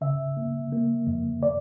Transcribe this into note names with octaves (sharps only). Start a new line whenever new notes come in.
C#3 E5
A#3
A#3
F2
D5